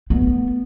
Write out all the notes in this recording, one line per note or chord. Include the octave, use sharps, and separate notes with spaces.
B3